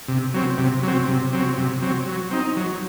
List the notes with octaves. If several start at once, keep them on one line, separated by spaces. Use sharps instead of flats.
C3
F#3 C4
C3
F#3 C4
C3
F#3 C4
C3
F#3 C4
F#3
C4 D#4
F#3